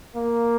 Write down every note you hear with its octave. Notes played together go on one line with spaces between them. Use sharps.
A#3